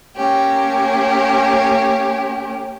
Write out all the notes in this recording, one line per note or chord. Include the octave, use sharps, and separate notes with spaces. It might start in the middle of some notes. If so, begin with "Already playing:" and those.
A#3 C#4 G4